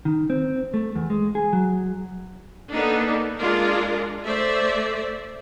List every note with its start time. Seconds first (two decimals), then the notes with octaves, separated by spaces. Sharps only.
0.05 D#3
0.30 C4
0.74 A3
0.95 E2
1.10 G#3
1.35 G#4
1.53 F#3
2.72 A#3 B3 D4 D#4 A4
3.39 G#3 D4 F4 A#4
4.26 A3 C5 D5 E5